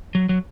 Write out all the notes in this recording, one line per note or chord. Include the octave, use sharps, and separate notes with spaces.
F#3
F#3